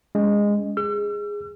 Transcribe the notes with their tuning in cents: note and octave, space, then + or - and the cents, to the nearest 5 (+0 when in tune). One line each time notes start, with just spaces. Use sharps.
G#3 -15 C#4 +35
G#4 -10 E6 +45